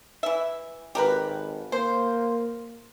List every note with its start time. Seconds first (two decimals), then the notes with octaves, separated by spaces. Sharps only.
0.23 E3 E5
0.95 G#1 G4 A#4 B4
1.72 A#3 C5